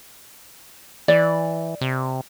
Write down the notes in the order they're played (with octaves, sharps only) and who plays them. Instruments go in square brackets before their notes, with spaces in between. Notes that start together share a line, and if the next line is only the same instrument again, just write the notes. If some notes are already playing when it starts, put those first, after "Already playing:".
[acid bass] E3 [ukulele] D5
[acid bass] C3